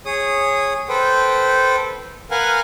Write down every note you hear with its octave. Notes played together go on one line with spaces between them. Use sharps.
G#4 C#5 D#6
A4 B4 C5 G5
A#4 B4 F5 F#5 G#5